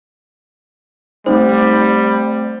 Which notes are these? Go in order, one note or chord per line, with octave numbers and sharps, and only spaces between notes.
G3 A3 C4 D#4 C5